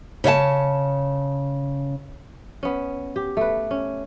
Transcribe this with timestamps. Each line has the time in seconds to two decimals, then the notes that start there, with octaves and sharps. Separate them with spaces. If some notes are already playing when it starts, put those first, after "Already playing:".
0.24 C#3 C#5 E5 A5
2.63 B3 C#4
3.16 G4
3.37 A3 B4
3.71 C#4